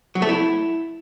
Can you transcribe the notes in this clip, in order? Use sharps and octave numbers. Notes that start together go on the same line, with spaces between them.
F#3
A3
E4